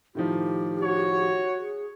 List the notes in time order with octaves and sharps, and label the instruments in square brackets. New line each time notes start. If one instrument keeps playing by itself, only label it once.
[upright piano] A2 D#3 F3 [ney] G4
[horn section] F#4 C#5
[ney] G#4